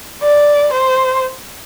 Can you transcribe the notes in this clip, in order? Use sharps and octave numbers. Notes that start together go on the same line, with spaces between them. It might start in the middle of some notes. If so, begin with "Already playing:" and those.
D5
C5